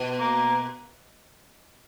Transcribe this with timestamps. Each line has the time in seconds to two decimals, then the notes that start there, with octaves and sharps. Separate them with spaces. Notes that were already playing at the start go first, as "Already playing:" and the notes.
Already playing: B2
0.20 A#3